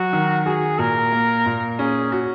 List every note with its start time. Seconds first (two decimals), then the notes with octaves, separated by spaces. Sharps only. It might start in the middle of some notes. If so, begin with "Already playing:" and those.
Already playing: F#3 F#4
0.13 D#3
0.46 F#4 G#4
0.79 A#2 A#4
1.12 A#3
1.46 A#2
1.79 C#4 G#4
2.12 F#4